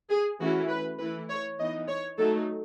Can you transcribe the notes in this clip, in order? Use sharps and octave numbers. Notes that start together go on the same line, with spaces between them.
G#4
E3 A3 C#4 E4 F#4
B4
E3 A3 E4 B4
C#5
E3 B3 D#4 D#5
C#5
F#3 A3 D#4 A4